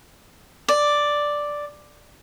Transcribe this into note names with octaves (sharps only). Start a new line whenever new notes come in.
D5